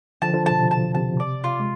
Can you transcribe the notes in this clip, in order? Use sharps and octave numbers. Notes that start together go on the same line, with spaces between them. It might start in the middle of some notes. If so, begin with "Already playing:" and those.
D3 F3 A5
D3 F3
B2 A5
C3
B2 A5
C3 A5
D5
F4
G#3